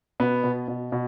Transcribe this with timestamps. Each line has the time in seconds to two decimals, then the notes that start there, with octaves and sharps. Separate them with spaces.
0.20 B2 B3
0.44 B2
0.68 B2
0.92 B2